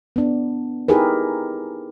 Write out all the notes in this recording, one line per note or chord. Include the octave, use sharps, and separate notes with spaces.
B3 D4
D#4 E4 G4 G#4 A#4 B4